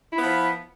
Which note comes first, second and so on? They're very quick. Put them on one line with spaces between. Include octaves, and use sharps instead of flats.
E4 B3 F3